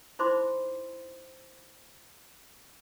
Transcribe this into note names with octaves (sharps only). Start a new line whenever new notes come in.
D#4 E4 C5 B5 C6 D6